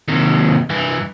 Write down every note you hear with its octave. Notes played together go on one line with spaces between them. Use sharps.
D#2 C3
G2 E3